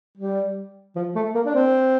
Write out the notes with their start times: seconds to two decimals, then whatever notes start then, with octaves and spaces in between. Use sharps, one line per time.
0.17 G3
0.95 F3
1.15 A3
1.34 A#3
1.46 D4
1.55 C4